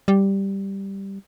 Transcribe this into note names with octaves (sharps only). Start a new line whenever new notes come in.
G3